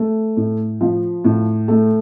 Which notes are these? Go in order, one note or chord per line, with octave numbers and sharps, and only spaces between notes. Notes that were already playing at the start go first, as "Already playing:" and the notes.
Already playing: A3
A2
F3
A2
A3